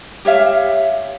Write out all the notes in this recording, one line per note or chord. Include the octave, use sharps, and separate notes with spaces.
G4 C#5 E5 F5